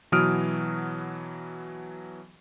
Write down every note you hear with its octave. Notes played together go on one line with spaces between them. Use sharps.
B2 E3 F#3 D#6 F6 D7